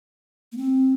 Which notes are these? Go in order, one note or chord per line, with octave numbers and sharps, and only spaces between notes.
A#3
C4